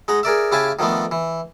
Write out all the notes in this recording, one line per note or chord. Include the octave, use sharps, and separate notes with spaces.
G#3 D#4 F#5 A#5
G#4 A#4 D5 E5
C#3 E4 G4 F5 G#5 A5
D#3 F3 A3 B3 D4
E3